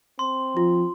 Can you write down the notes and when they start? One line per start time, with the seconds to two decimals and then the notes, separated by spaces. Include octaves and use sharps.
0.19 C4 C6
0.57 F3 F4